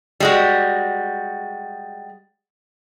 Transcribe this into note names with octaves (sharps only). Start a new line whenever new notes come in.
G3 G#3 F#4